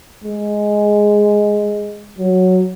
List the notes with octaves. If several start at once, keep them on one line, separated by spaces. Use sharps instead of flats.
G#3
F#3